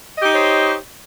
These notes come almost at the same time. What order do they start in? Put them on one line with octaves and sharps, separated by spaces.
D#5 G4 D#4 C#5 C5